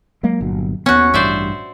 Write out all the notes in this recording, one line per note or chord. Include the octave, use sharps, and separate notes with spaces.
F#3 G#3 A#3
G1 A#2 F#3
D#2 B3 C#4 F#4
A1 G2 C5 D5 E5